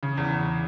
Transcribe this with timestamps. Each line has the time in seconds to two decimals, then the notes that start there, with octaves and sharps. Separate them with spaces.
0.03 C#3
0.17 E2
0.32 E2